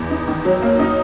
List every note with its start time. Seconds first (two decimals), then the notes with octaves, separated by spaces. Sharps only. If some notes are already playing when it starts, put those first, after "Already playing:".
Already playing: E2
0.10 D#4
0.28 D#3
0.45 F#3
0.62 A#3
0.79 D#4